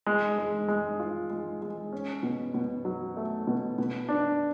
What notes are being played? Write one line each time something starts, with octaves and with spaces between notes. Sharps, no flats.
G#3
G#3
G#3
F4
G#3
G#3
C#4
B2
B2
F#3
A3
B2
B2
D4